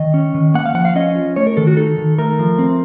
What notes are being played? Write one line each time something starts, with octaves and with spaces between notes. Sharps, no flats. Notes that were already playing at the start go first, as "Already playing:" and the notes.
Already playing: D#3 D#5
C#4
D#3
A#3 F#5
F5
F3 F#5
F5
C#4 D#5
F4
A3 C#5
A#4
D#3 A4
F#4
D#4 A4
D#3
A3 A#4
F3
C4